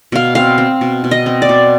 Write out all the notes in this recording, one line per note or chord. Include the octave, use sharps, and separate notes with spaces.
B2 F5
C4 F5
C4
B2
B2
D#5
C4
D5
B2